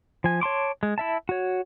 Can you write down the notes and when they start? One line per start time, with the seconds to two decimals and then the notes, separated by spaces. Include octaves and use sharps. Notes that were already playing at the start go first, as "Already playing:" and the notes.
0.24 F3 G#5
0.41 C#5 A5 C6 D6
0.83 G#3
0.98 E4 E5 A5
1.29 F#4 C#5